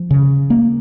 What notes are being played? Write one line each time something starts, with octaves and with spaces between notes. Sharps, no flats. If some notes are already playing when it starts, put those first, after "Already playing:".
Already playing: F3
C#3
A#3